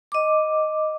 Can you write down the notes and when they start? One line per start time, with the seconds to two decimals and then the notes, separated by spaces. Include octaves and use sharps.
0.12 D#5 D6